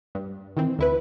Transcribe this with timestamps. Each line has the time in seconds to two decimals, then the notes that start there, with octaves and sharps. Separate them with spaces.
0.15 G2
0.57 D#3 E3 C4
0.79 D2 E4 B4